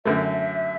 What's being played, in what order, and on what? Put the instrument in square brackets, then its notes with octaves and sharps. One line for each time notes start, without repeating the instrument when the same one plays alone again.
[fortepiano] F#2 D3 A3 [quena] E5